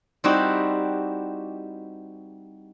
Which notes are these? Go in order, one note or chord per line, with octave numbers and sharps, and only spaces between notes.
G3 C4 D#4 E4 F#4 G4